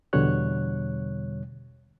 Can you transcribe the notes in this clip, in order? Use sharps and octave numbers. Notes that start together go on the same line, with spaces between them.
E2 B2 D3 G3 C#5 F#6